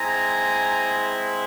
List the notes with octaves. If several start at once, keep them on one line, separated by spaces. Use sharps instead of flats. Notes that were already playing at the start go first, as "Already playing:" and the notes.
Already playing: G#3 C4 E4 G#5 A#5